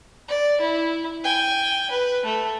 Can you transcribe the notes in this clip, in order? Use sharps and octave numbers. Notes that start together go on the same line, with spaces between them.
D5
E4
G5 G#5
B4
A3